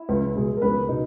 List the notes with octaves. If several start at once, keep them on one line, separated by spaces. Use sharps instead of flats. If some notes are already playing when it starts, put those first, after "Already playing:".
Already playing: E4 E5
C#2
B2 G#3
A#4
C#2 B3 B4
B2 D#4